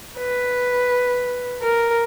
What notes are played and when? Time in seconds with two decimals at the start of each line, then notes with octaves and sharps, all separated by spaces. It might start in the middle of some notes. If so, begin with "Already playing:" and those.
0.18 B4
1.62 A#4